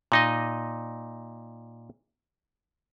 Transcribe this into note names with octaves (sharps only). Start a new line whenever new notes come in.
A#2 D#4 D#5